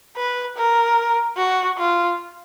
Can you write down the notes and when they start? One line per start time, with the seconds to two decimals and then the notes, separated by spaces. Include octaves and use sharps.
0.16 B4
0.56 A#4
1.37 F#4
1.78 F4